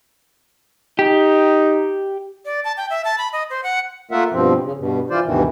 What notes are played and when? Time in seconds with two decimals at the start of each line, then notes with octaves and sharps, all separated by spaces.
0.99 D#4 G4
2.45 D5
2.64 A5
2.77 G5
2.90 E5
3.04 A5
3.18 B5
3.33 D#5
3.50 C5
3.63 F#5
4.11 A3 A#3 F4 A#4 E5 F#5
4.32 G2 B2 F3 C4
4.63 C#3
4.77 G2 B2
5.10 E3 F4 C5 D5
5.24 D2 G2 B2 D#3 E3